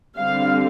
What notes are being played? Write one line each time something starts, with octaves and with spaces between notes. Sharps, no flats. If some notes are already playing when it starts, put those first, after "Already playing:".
D3 G3 C4 F5